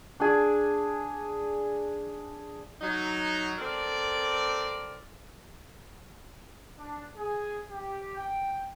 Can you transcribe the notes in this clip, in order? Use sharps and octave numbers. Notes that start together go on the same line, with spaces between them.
D4 G#4
F#3 D#4
C4 A4 A#4 D5
D4
G#4
G4
G5